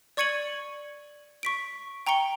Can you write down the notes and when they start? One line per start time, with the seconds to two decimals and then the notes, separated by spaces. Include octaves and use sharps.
0.17 D5 C#6 G#6 C#7 D#7 F#7
1.43 C#6 B6 D7
2.07 G5 A#5 C#6 C#7 G7